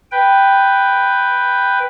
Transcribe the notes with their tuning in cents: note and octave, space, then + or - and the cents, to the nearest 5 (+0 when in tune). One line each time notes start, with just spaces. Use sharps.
B4 +0 G5 +0